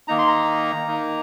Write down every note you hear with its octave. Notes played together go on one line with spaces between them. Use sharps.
D#3 A#3 D#4 A#5
C6
A#5
D#3 A#3 D#4